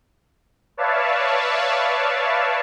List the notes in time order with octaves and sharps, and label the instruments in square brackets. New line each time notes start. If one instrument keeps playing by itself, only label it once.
[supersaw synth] B4 C#5 D5 E5 F5 A5